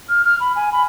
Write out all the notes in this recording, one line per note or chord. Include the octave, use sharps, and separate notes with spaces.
F6
F6
B5
G#5
B5